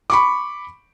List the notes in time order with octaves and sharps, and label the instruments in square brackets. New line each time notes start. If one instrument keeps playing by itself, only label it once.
[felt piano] B5 C#6 D6